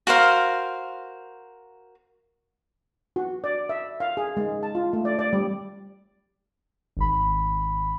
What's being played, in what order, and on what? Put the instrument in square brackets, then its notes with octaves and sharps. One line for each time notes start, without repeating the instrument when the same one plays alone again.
[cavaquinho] F#4 A#4 C5 F5
[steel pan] F#4
D5
E5
F5
G#4
G#3
A5
F4
A3
D5
D5
G3
[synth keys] G#1 B5